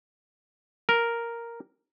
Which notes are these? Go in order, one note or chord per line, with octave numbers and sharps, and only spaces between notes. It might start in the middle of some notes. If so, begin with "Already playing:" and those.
A#4